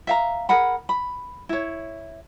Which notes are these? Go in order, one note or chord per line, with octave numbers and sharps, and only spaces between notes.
E5 F5 A#5
G#4 A#4 F#5 B5
B5
E4 C#5